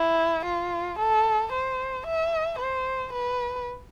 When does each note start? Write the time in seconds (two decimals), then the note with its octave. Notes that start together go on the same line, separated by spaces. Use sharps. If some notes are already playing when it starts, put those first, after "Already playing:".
Already playing: E4
0.45 F4
0.99 A4
1.53 C5
2.07 E5
2.59 C5
3.13 B4